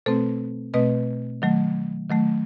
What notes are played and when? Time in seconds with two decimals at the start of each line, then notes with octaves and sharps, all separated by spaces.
0.06 B2 A3 C4 A4 C5
0.74 B2 A3 C4 B4 D#5
1.42 D#3 F#3 A3
2.10 D#3 F#3 A3